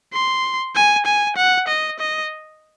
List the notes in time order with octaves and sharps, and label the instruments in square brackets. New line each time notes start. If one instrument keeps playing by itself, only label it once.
[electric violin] C6
G#5
G#5
F#5
D#5
D#5